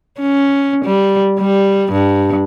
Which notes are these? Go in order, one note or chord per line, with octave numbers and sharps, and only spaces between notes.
C#4
G3
G3
G2